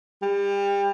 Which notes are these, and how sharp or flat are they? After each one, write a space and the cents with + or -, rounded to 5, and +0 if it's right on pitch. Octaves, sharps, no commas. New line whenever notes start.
G3 +30